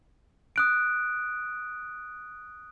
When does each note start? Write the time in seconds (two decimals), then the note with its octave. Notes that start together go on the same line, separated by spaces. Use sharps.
0.56 D#6 F#6 D7